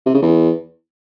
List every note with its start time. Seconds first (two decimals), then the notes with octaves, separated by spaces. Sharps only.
0.06 C3
0.14 C#3
0.22 E2